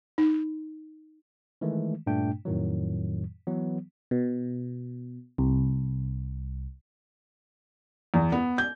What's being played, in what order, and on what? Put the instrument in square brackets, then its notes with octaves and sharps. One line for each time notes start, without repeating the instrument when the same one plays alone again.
[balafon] D#4
[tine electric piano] D#3 E3 G#3 A3
G2 A#2 A3 D4 G5
F2 A2 D#3 F#3
E3 F#3 B3
[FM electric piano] B2
C2
[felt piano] E2
B3
G6